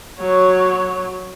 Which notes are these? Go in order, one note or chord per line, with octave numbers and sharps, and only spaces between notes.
F#3 C#5